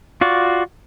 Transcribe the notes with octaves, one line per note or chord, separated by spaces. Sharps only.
F4 F#4 D5